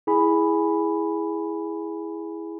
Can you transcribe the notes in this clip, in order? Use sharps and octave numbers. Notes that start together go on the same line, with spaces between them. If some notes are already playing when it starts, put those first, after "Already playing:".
E4 G#4 G#5 B5